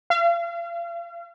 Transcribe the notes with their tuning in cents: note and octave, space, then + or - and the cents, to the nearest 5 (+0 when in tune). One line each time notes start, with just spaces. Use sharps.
F5 -40